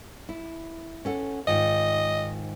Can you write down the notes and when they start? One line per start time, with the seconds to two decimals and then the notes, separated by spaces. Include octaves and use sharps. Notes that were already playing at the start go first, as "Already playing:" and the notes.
0.29 E4
1.05 C#4 A4 F#5
1.47 G#2 D#3 F4 D#5